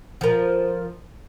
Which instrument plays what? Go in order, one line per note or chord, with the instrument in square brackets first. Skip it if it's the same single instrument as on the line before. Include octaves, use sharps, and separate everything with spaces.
[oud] F3 A#4